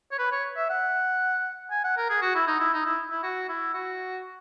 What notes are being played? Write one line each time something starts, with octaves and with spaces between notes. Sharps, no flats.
C#5
B4
C#5
E5
F#5
G#5
F#5
A#4
G#4
F#4
E4
D#4
E4
D#4
E4
E4
F#4
E4
F#4